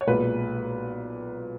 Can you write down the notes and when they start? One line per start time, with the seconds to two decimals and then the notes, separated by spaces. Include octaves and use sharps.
0.01 C#5
0.07 B1 A#2 G#3 B4